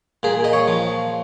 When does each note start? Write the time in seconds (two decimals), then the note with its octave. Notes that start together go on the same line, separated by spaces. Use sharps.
0.23 A#2 G#4
0.44 D#5
0.53 C#5
0.68 F3